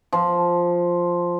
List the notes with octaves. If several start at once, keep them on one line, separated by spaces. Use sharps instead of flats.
F3